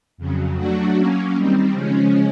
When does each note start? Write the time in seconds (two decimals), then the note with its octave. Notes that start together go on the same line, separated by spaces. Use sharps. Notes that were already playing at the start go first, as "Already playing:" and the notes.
0.18 F2 C#3 F#3
0.57 F#3 A3 D4 F#4
0.95 F#3 A#3 C#4
1.34 D#3 G3 C4
1.73 C#3 F3 G#3 C#4